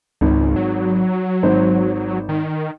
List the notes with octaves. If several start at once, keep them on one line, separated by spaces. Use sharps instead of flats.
G#1 C#2
F#3
G#1 C5
D#3